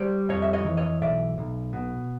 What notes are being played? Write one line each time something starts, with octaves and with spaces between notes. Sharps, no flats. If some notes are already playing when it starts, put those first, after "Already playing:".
Already playing: G3 C5 D5
F2 C#5 D#5
E5
C#5 D#5
E3
C#5 D#5
B1 D5 E5
B1
B2